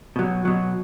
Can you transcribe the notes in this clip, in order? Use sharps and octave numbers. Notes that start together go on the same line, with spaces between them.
B2 F#3
B2 F#3